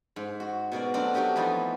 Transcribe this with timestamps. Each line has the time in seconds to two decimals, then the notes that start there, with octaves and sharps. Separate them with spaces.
0.16 G#2
0.40 F#4
0.72 B2 F#4 A#4 D5
0.94 F#3 A3 C4 D4 A#4
1.14 F#3 D4 F#4 G4 D#5
1.36 F2 E3 B3 D#4 F4 F#4